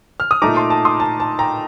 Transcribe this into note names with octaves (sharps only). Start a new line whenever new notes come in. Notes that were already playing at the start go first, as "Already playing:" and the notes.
F6
D#6
A#2 A3 D#4 A#5 D6
A5 C6
A5
C6 D#6
A5
A5
G5 A#5